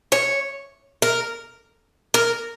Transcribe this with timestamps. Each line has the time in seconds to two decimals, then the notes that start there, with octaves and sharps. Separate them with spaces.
0.12 C#5
1.02 A#4
2.14 A#4